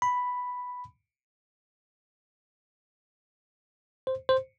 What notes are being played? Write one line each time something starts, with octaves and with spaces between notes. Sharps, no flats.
B5
C5
C5